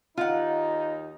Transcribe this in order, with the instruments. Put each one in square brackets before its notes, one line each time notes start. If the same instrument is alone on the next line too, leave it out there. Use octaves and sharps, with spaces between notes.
[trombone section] D#2 D#4 [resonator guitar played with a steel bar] F4 F#5